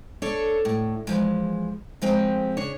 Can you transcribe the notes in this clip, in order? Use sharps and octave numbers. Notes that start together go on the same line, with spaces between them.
D4 A4 C#5
A2
E3 F3 G#3
F3 G#3 C4 G4
C#3 D4 C#5